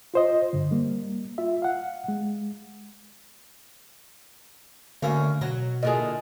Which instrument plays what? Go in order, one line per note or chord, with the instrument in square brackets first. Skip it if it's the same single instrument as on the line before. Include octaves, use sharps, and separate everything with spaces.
[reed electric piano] F4 C5 D#5
G2 D3
G3 A#3
F4 E5
F5 F#5
G#3
[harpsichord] D2 A#3 E5 [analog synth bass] D3 [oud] C#4
[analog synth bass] B2 [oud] F#3 [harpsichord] A#5
[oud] A#2 D3 G#4 [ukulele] E4 D#5